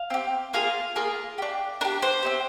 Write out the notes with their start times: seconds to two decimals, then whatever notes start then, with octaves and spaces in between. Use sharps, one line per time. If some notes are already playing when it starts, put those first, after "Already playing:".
Already playing: F5
0.10 C4 G4
0.53 A#3 F4 G#4 F5
0.96 A#3 F4 G#4
1.38 D4 G4
1.81 D4 A#4
1.85 G4
2.02 C5
2.23 C4 D#4 G4